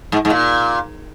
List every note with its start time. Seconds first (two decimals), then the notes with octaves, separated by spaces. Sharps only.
0.12 G#2
0.25 G#2
0.30 A#2